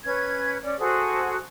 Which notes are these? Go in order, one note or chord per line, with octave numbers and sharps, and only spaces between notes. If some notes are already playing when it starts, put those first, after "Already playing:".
C#4 B4 G#6
C#4 D5
F#4 G#4 A4 C5